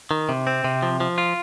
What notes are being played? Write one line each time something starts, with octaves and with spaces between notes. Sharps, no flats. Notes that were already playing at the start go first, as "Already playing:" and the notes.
D#3
C3
C4
C3
F3
F3
F4